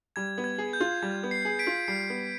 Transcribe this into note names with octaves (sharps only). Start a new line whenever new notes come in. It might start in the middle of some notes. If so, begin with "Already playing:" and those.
G3 G#6
B3
G#6
G#4
G6
F4
G3 G#6
B3
C7
G#4
B6 D7
F4
G3 C7
B3